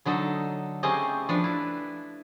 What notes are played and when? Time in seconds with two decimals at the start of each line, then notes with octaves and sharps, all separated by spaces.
0.05 D3 F#3 D#4 A4
0.83 C#3 A3 C4 C#4 G4 D#5
1.29 F3 D4 B4
1.44 E4